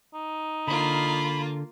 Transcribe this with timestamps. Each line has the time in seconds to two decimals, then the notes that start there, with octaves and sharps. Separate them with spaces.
0.14 D#4
0.67 D3 A#3 F4 B5